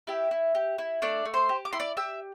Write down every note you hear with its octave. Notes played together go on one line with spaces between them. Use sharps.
E4 G4 E5
E4
G4
E4
A3 D4 D5
A3
C5 C6
G4
D6
E4 C6
D5 D6
G4 E5 E6